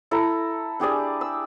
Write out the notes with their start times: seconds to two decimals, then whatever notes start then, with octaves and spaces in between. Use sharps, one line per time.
0.11 E4 A4 A#5
0.80 D4 G4 G#4 D5
1.21 E6